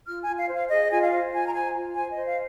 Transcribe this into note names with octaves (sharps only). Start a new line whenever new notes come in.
F4 F6
G#5
F4
F5
C5 F5
G#4 D#5
F4 G#5
F5
C5
F4 G#5
A#5
C5 G#5
F4
C5 G#5
D#5
C5
F5